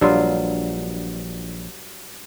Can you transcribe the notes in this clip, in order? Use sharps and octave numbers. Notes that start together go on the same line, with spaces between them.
A#1 G2 F#3 F4